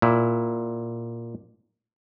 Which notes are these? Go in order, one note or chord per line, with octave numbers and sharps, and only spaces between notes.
A#2 E4